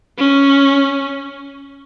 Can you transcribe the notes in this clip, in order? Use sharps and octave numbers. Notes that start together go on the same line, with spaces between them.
C#4